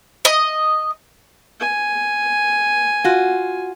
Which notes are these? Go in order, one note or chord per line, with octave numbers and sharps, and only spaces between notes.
D#5
G#5
F4 F#4